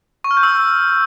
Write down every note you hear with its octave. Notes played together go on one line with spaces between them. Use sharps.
C#6
F6
G6
E6